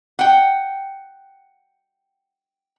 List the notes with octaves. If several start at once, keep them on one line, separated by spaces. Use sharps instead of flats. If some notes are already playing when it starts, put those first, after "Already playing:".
F#5 G5